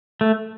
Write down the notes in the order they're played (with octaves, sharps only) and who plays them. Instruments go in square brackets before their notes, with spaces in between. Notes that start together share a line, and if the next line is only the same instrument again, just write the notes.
[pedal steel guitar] A3